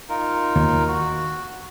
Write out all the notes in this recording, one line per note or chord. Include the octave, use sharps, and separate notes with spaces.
D#4 F4 A#4
D#2
F#4